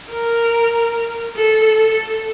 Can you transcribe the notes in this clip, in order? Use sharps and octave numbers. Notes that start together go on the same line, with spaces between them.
A#4
A4
A4